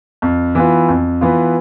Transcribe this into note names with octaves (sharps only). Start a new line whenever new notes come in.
F2
E3 B3 F4
F2
E3 B3 F4